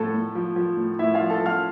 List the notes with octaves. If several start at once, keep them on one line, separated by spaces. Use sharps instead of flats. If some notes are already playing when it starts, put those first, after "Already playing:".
Already playing: A2 F3 A4 A5 B5
A2
F3
F3
A2
A2 E4 E5
F4 F5
F3
A4 A5
F3 F5 F6